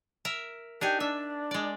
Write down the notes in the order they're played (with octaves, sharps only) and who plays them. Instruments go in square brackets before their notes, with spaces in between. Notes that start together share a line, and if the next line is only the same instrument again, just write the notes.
[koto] A#4 E5
[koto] D4 D#4 G#5 [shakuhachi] G4
[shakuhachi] D4 [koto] E5
[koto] G#3 D5